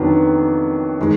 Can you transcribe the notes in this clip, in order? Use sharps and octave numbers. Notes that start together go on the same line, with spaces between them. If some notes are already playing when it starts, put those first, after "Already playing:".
Already playing: F2 D#3 F#3 B3 D4
D#3 G#3